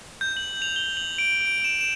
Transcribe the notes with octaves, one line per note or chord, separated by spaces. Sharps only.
G6
F#7
F7
G7
F#7
D7
D7
E7
E7